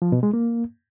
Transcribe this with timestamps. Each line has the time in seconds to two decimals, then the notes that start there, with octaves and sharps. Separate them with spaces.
0.02 F3
0.12 B2
0.23 G#3
0.34 A#3